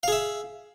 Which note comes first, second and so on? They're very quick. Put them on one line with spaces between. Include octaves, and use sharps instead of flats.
F5 G#4 E5